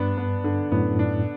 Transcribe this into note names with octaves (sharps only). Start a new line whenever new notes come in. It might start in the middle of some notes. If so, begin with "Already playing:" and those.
Already playing: G2 B3 D4
B3
D3
F#2 A2 B3
D4